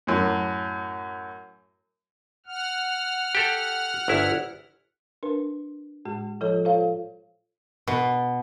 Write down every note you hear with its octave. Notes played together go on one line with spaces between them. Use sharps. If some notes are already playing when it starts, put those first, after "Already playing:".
F#2 A2
F#5 F6
G4 A4
G1 D2 E4
D4 A#4 B4
A2 G#3 F#4
F3 F4 A4 C#5
F4 A4 C5 C#5 F5
B2